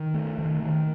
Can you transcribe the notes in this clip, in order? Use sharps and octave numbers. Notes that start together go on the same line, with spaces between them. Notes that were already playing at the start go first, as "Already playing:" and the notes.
Already playing: D#3
A3
D#3
D#3